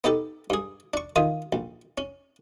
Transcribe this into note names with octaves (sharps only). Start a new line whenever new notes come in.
B3 D#4 G4 A4
G2 G#4
D4 C#6
D#3 F4 D#6
A#1
C#4